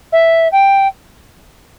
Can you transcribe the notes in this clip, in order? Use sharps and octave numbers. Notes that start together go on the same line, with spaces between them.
E5
G5